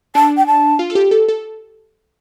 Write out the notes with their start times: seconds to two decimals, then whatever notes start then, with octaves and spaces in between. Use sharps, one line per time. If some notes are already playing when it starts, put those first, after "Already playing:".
0.15 D4 A5
0.37 G5
0.47 A5
0.79 F4
0.90 A4
0.95 G4
1.11 A4
1.29 A4